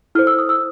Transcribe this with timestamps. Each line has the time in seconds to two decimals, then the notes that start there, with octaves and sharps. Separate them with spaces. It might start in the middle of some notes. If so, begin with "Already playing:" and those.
0.15 E4 A4 C5 F6
0.27 E6
0.39 D#6
0.49 E6